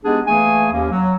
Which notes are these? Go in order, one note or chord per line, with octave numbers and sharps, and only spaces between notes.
G#3 B3 D4 D#4 G4 G#4
E3 A3 A#3 G#4 G#5
D#2 A#3 C#4
F#3